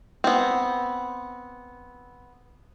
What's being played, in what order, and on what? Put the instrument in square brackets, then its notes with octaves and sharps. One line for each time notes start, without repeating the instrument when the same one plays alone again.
[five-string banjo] B3 C4